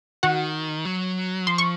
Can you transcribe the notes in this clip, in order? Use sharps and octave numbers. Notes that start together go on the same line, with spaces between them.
D#3 F#4 F#5
F#3
F3 C6
C#6